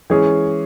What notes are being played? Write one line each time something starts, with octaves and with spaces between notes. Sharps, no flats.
E3 G#3 C#4 G#4